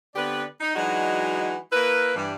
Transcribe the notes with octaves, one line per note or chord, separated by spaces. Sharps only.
D3 B3 C4 G4 B4 D5
D#4
E3 F#3 G#3 D4 D#4 F#4
A#3 E4 A#4 B4
G2 E3 G3